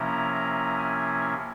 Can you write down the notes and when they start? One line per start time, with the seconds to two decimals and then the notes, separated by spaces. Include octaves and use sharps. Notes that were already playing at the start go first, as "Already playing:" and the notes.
Already playing: C3 F3 A#3 C#4 E4 A#5
0.32 A#5
0.79 G#5